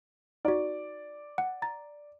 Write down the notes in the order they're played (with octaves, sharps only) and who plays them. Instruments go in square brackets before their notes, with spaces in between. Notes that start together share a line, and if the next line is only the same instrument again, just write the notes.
[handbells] D#4 F#4 [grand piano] D5
[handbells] F#5
A#5 A6